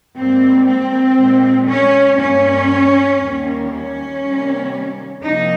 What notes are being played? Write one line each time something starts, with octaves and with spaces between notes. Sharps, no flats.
G#2 G3 A#3 C4
C4
A#2 G#3
C#4
G2 G3 A#3 C#4
D#2 D#3 G3 A#3
C#4
C3 D#3 G3 A#3
C3 F3 A#3 D#4